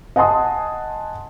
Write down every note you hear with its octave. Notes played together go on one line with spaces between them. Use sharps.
D#5 F#5 G#5 A5 C6 D#6